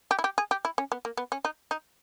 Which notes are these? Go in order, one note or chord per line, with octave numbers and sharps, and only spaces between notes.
G4
E4
G4
G#4
G4
E4
C#4
B3
A#3
B3
C#4
D#4
D#4